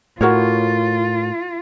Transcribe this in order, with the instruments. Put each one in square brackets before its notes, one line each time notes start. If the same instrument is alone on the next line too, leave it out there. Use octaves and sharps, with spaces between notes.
[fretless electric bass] A2 [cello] F4 [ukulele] F#4 A#4 C#5